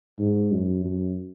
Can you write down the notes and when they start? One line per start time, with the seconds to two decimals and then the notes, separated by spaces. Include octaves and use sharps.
0.19 G#2
0.51 F#2
0.84 F#2